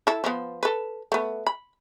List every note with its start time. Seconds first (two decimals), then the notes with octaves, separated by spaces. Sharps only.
0.07 E4 A4
0.24 F3 B3
0.63 A4 B4
1.12 A3 B3
1.47 B5